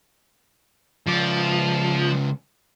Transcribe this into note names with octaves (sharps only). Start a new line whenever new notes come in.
C#2 F3 D5